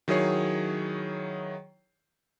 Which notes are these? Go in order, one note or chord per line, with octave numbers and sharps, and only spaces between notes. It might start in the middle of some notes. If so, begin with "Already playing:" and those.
D#3 F#3 E4 G#4 C#5 C7